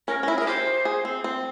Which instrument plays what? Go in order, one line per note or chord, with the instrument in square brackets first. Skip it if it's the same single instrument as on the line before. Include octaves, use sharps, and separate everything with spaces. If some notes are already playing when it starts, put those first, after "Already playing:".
[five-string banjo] C#4 [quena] A#4
[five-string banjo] C#4
[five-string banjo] E4 [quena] A#4
[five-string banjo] G#4 [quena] A#4
[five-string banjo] G4 [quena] C5
[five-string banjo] G#4
C4
C4